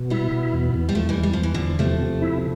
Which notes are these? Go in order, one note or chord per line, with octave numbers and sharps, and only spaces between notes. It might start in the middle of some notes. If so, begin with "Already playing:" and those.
Already playing: B2
G3 B3 E4
B2
E2
E2
G3
E2 F3 A3
E3 G3
E2
G3
E2 F3
E3
E2 D3 F3
C3 F3 A3
C3
E4